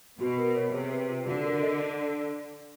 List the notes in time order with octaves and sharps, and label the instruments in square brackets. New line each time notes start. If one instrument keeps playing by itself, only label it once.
[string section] B2 [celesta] F#4
[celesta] A#4
C#5
[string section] C3 [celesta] G#4
[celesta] B4
F4
[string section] D3 [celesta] F#4
[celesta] A#4
D#5